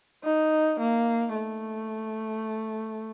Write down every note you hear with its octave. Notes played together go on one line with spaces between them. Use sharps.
D#4
A#3
A3